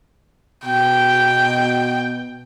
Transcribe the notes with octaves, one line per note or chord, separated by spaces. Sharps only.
B2 G5